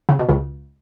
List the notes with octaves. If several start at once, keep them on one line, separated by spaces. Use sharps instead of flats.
C#3
B2
C#2 C#3